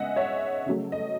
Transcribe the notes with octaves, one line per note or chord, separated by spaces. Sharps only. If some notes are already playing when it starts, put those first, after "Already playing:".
Already playing: C#3 G#3 B3 D#5 E5 F#5 G#5
C#5 E5
C#3 F#3 A3
D#5